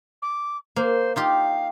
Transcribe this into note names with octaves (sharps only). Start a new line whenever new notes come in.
D6
A#3 C5
D#4 F4 G4 F5